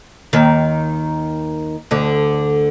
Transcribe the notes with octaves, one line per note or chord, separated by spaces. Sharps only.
D#2 D#3
D2 D3